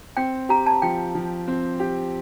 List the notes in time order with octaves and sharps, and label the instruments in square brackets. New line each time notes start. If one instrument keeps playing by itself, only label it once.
[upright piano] C4 [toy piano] G5
[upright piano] G4 [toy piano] A#5
[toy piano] A5
[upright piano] F3 [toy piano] G5
[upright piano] F3
C4
G4